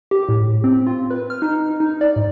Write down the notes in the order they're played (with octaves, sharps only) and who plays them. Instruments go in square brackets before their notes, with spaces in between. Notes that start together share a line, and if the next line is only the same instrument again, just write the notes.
[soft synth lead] G4
A2
C4
F4
B4
F6
D#4
D#4
D5
G#2